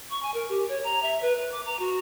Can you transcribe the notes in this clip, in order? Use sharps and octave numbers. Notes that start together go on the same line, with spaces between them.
C#6
G#5
A#4
G4
C#5
A#5
E5
B4
B4
D6
A#5
F#4